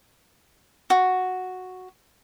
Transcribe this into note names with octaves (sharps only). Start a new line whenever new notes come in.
F#4